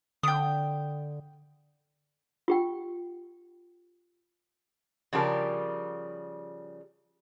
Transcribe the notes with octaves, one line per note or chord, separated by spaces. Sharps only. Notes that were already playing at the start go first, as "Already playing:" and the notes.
D3 G5 D#6
F4 G4 G5
C#3 F3 G3 G4 A#4